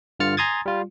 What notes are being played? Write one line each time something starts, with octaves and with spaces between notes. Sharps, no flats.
G2 D3 F4 F6 A6 C#7
G#5 A#5 C6 D#6 G#6 A6
G3 F4